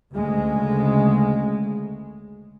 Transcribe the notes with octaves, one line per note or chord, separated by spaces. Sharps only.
D2 C#3 G#3